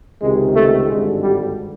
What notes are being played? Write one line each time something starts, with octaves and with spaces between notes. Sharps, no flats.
C#2 C3 D#3 G#3
A3
G#1 G2 D3 G#3
G3